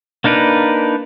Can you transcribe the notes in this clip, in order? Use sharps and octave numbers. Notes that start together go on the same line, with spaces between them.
A#3 D4 D#4 A#4 B4